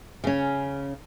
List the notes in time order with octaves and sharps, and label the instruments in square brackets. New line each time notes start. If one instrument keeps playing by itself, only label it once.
[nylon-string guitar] C#3 C#4